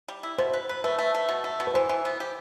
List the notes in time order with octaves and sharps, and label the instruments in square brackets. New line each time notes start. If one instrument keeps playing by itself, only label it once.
[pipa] G3
E4
[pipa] B2 [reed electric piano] C5
[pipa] B4
B4
[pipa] A3 [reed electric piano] B4
[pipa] A3
A3
B2
A3
B2
[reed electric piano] B4
[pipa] E3 [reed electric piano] C5
[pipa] E3
B3
G4